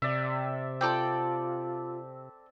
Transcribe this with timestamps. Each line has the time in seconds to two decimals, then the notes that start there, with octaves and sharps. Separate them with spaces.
0.02 C3 D5 E5
0.81 C4 F4 A4 D5 G5